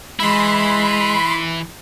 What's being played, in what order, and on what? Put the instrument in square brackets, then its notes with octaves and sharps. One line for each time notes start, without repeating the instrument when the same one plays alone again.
[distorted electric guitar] E3 E4 [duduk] G#3 [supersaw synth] B5 C6